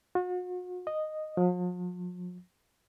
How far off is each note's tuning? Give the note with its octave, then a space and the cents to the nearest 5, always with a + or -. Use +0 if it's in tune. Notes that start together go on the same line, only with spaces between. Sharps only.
F#4 -40
D#5 -10
F3 +45